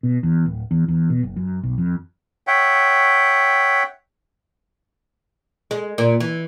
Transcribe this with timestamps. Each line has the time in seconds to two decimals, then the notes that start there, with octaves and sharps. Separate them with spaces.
0.03 B2
0.23 E2
0.46 D1
0.71 E2
0.88 E2
1.10 B2
1.23 F#1
1.36 F#2
1.63 B1
1.78 F2
2.47 C#5 E5 F#5 G5
5.71 G#3
5.98 A#2
6.20 E3